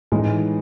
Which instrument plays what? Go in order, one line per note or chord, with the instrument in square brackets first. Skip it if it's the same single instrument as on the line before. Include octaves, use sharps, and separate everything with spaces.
[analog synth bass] A2 [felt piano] E3 G#3 D#4